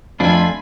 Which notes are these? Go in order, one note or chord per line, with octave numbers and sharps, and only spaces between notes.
F2 F3 A3 D4 F4 G#5 B5